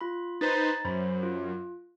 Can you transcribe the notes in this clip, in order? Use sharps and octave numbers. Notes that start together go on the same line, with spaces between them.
F4 B5
D#4 B4 C5 A#5 A6
F#2 C5 B5
F4